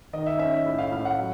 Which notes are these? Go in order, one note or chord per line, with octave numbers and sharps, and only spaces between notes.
D#3 D#5
E5
C#4 E5
A2
F5
A2 F5
F#5
F#3